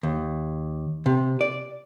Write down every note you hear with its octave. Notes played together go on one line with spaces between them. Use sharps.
D#2
C3
D5